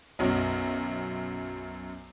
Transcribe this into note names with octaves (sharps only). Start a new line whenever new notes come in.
B1 F#2